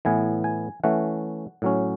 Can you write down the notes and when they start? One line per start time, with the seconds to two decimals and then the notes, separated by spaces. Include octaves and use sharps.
0.05 A2 E3 B3 G#5
0.44 G#5
0.84 E3 A3 C#4 F#5
1.62 A2 F#3 C#4